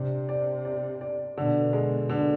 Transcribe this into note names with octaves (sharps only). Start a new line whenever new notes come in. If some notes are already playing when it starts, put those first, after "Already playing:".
Already playing: C3 D4
D5
D5
D5
B2 D3
G#3
D3